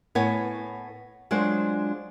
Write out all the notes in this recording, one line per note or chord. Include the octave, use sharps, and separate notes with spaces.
A2 B3 C#5 G#5
F#3 G#3 D4 F4 C5